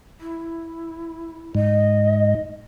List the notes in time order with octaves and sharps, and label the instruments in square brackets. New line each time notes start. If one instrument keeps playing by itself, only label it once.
[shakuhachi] E4
[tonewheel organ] G#2 [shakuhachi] D#5